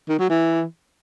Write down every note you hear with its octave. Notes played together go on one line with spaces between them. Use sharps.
D#3
F#3
E3